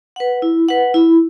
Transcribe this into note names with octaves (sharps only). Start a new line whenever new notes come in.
B4 F#5
E4
B4 F#5
E4